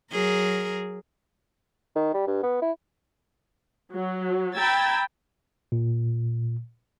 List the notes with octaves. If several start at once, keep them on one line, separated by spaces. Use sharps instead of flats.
F#3 G#4 A#4
D#3
G3
G2
B3
E4
F#3
G5 A#5 B5 E6 G#6 A6
A#2